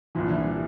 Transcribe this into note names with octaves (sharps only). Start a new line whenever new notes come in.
C2 A#2 E3 F3 E4
D4
E3 E4
G3